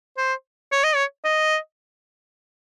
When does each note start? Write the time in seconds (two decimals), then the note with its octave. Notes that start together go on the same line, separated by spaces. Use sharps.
0.18 C5
0.72 C#5
0.84 D#5
0.95 C#5
1.25 D#5